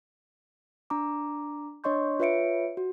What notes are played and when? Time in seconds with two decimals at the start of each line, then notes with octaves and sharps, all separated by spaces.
0.90 D4 A#5 D6
1.84 D4 C#5 D#5 C6 C#6 G6
2.19 F4 B4 C#5 E5 C#7 D7
2.77 F#4